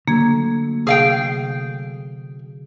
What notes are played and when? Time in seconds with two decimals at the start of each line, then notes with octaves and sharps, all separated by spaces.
0.08 D3 F#3 A3 A#3 G#6
0.87 C3 G#4 F5 G5